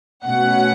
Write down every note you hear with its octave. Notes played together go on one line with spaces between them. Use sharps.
B2 A3 C#4 F#5